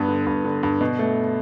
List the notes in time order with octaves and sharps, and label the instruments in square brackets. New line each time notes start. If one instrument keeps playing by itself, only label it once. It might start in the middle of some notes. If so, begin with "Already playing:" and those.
Already playing: [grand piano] G2 B3
D3
G2
D3
G2
B2
A3